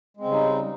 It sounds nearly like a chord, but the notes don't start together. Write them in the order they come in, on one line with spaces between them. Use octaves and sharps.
G#3 C4 C#3 G3 D#4